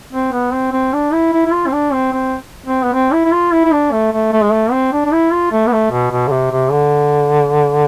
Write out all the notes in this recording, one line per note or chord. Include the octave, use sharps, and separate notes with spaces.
C4
B3
C4
C4
D4
E4
E4
E4
F4
C4
D4
C4
C4
C4
B3
C4
E4
E4
F4
E4
E4
D4
A3
A3
A3
G#3
A3
C4
D4
D4
E4
F4
A3
B3
A3
B2
B2
D3
C3
C3
D3